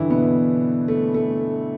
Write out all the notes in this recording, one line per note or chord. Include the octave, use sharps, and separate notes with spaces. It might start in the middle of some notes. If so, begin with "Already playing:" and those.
Already playing: G2 D3 E3 E4
B2 B3
A3
A3